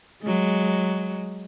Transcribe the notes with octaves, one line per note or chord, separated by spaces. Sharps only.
F#3 G#3